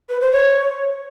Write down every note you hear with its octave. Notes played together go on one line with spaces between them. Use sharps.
B4
C5
C#5